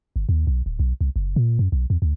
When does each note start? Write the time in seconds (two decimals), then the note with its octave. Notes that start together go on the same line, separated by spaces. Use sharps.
0.16 G1
0.29 D#2
0.47 B1
0.66 D1
0.79 B1
1.01 C2
1.16 F#1
1.36 A#2
1.59 F#2
1.72 B1
1.90 E2
2.02 D2